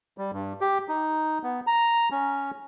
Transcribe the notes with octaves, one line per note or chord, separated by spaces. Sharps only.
G3
G2
G4
D#4
B3
A#5
C#4